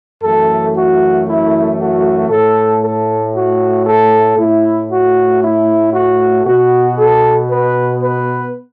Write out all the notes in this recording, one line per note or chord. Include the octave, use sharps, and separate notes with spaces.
F#2 E3 A3 A4
F#4
E4
F#4
A2 A3 A4
A4
F#4
A4
A2 A3 E4
F#4
E4
F#4
B2 B3 F#4
A4
B4
B4